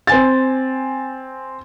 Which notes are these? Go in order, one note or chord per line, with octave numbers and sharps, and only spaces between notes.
C4 G#5 A6